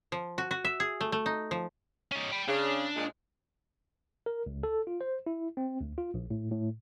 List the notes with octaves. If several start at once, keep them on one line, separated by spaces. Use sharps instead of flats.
F3
F#4
F#4
E5
G#4
A3
A3
D#4
F3
C#4 D#4
G5 B5
C#3 D4
A#2 G#3
A#4
C#2
A4
F4
C5
E4
C4
D2
F4
A#1
A2
A2